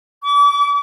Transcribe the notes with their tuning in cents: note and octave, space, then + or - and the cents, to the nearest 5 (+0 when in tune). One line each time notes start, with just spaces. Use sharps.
D6 -40